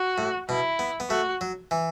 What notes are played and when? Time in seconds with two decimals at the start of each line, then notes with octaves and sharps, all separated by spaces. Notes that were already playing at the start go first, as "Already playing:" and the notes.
Already playing: F#4
0.18 A2
0.49 B2 E4
0.79 B3
1.00 B3
1.10 A3 F#4
1.41 F#3
1.71 E3